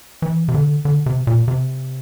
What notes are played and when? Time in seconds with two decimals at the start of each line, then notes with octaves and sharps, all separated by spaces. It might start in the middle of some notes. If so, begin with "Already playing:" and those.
0.22 E3
0.48 C3
0.54 D3
0.85 D3
1.06 C3
1.27 A#2
1.48 C3